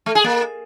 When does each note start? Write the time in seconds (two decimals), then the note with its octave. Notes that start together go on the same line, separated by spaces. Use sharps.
0.06 A3
0.15 G#4
0.24 A#3